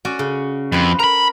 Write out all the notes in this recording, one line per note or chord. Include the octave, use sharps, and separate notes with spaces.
C#4 F#4 D5
C#3
F2 B4 C5
A#4 A#5 B5